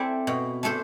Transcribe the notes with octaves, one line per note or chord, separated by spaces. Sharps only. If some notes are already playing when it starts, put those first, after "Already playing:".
Already playing: C4 E4 A4 D5
B2
A3 D4 A4 C5